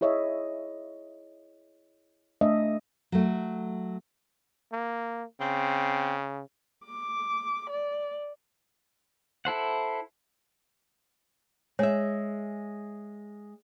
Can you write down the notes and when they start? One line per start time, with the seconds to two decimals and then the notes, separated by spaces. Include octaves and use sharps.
0.01 E4 G#4 C#5 D#5 E5
2.41 A3 D4 D#5 E5
3.12 F#3 A3
4.72 A#3
5.40 C#3 C4
6.85 D6
7.70 D5
9.45 E4 A4 C5 F#5
11.79 G#3 C#5 E5